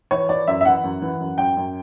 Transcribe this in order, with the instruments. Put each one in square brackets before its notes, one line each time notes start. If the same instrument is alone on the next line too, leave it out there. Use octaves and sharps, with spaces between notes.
[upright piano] E3 C#5
E3 D5
F#2 E5
E5
E3 F#5
F#2
E3
F#2
F#2 G5
F#2